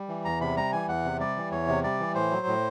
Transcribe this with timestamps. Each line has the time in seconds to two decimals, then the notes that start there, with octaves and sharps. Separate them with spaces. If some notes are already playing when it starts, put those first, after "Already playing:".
Already playing: G3
0.09 E3
0.25 E2 A#5
0.41 C3 B5
0.57 G3 A#5
0.72 E3 G#5
0.88 E2 F#5
1.04 C3
1.20 G3 D5
1.36 E3
1.51 E2 C#5
1.68 C3
1.84 G3 D5
1.99 E3
2.15 A2 C5
2.30 F#3
2.47 A2